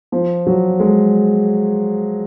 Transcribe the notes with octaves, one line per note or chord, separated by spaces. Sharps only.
F3
F#3
G#3